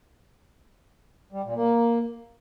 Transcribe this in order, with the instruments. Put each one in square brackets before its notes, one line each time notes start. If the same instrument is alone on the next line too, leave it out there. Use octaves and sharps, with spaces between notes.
[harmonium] G3
A#2
A#3